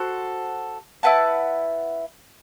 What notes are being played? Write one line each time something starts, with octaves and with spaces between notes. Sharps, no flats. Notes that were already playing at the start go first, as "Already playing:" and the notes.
Already playing: F#4 A4 C5
E4 B4 F#5 A5